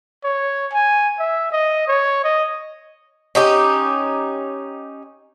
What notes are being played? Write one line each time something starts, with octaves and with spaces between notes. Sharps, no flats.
C#5
G#5
E5
D#5
C#5
D#5
C#4 D#4 G4